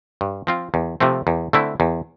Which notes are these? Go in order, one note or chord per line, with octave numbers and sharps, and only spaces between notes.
G2
F3 C4 F4
E2
C3 F3 A3 C4
E2
D3 A3 C4 E4
E2